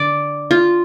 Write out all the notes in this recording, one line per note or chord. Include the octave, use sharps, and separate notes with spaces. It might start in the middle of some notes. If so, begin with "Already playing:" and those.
Already playing: D3 D5
F4